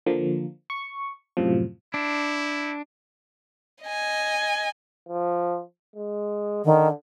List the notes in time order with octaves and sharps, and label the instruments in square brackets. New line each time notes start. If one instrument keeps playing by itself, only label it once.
[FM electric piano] D3 F3 A#3
C#6
F#2 A2 C3 F3
[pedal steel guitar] D4 [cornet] E4
[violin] D#5 G#5
[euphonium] F3
G#3
[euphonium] D3 [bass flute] D#3